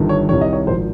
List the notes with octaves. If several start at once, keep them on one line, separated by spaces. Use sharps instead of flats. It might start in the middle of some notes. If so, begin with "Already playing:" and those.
Already playing: G1 G2 D#3
C#5
C2 C3 D#3 C#5
D#5
C#5
G#1 F3 C5